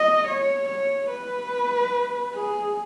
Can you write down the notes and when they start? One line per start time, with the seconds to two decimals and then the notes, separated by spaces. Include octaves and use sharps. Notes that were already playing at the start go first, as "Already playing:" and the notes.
Already playing: D#5
0.27 C#5
0.69 C#5
1.10 B4
2.34 G#4